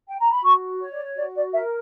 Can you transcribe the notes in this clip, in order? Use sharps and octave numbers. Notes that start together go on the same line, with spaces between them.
G5
A#5
B5
F#4 C#6
C#5
D5
F#4 D5
D5
A#4 E5